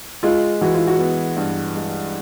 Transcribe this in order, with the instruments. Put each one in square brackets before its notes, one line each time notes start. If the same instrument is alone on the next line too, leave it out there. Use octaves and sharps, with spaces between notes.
[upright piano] G#3 [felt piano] F4
[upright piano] E3 [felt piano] F#4
[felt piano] F4
F#4
[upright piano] B3
G2
G#3